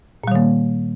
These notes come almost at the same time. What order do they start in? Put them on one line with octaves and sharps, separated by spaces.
A#2 G3 D#3 A#3